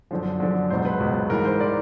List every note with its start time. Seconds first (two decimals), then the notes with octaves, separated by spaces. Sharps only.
0.11 F#2 D3 F3 C5
0.40 F#2 D3 F3
0.70 C#2 B2 F#3 C5
0.85 B4
1.00 C#2 B2 F#3
1.30 G#2 E3 A#4
1.45 C5
1.60 E3 D5